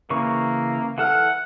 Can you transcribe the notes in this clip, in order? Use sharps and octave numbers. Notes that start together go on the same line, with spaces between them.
C#3 E3 A#3 C#6
E3 A4 F#5 F6